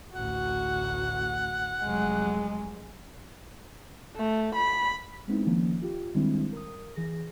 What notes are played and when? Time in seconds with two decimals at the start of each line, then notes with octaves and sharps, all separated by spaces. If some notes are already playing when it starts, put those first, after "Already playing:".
0.15 A1 D2 F#4 F#5
1.84 F1 F#3 G#3
4.17 A3
4.55 B5
5.28 G#3 B3 C4 D#4 E4
5.46 D#3 F3 A#3 C#4
5.82 F4 G4
6.15 D#3 G3 G#3 C4 D4 E4
6.52 A#4 D#6
6.96 E3 G#4 A#6